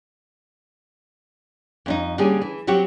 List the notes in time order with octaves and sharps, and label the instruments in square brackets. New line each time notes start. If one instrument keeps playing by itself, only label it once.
[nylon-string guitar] F2 D4 D#4
D3 G3 A#3 C#4 G#4
E3
F#3 C4 F#4 G4